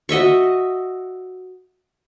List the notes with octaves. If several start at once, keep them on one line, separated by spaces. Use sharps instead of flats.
F#4 D#5 E5 C#6